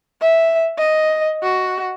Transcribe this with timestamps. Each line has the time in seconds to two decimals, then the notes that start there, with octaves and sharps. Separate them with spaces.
0.21 E5
0.78 D#5
1.43 F#4